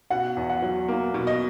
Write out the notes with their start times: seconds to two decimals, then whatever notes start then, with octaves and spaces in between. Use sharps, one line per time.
0.10 B2 F#5
0.37 E2
0.49 F#5
0.62 F#3
0.88 A#3
1.14 B2
1.27 D#5